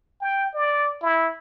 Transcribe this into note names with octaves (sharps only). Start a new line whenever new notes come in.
G5
D5
E4